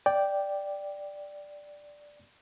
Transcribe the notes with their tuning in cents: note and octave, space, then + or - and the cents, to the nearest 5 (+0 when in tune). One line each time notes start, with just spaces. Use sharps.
D5 +0 G5 +0